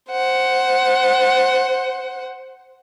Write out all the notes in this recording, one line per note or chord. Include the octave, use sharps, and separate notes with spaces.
C5 F#5